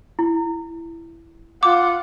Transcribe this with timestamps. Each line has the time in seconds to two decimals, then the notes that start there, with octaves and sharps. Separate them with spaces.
0.19 E4
1.63 F4 F#5 D6